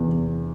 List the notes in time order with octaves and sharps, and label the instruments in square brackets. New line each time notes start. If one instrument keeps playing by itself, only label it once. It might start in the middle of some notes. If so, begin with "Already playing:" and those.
Already playing: [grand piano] E2 C3